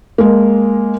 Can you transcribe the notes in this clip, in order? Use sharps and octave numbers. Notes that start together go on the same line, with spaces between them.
G#3 A#3